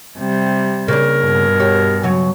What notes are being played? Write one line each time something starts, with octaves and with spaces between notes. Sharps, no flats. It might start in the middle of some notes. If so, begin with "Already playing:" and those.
C3 G3
C#3 A#3 D4 A#4
G2 B2
G4 C#5
C#3 F#3